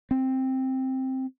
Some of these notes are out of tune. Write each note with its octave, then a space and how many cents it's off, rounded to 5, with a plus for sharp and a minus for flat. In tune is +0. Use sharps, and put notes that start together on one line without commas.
C4 +5